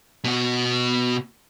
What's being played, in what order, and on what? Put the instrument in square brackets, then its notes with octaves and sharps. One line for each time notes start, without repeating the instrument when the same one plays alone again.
[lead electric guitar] B2 F#4